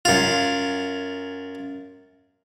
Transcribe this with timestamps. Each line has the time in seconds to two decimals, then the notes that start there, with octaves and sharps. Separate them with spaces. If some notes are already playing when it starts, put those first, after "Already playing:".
0.05 F#2 F4